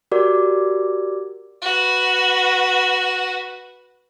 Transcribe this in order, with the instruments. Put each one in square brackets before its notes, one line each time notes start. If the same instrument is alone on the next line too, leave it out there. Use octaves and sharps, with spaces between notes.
[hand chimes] F#4 G4 A#4 D5 D6
[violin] F#4 B4